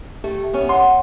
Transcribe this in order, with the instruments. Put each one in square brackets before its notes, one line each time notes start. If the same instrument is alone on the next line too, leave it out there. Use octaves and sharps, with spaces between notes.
[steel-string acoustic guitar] A3 [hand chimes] G4
[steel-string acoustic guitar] B3 C#4
[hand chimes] C#5 [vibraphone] F#5 [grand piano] C6